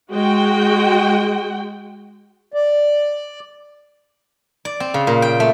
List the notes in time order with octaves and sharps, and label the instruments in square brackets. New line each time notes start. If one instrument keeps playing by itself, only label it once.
[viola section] G#3 F#4 G5
[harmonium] D5
[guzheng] D5
C4
C#3
A#2
G5
A3